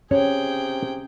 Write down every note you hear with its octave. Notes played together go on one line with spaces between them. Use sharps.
C3 C#4 G#4 C#5 G5